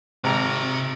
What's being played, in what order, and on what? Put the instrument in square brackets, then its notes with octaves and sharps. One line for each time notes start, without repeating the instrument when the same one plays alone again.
[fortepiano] G#1 A#5 [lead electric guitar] C3